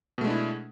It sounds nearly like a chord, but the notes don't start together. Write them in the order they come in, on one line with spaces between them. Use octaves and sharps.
B2 A3 G#3 D4 E4